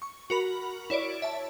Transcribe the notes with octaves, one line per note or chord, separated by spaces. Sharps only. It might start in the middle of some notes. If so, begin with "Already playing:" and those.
C#6
F#4 A#4 B5
E4 C#5 D5 D7
E5 A5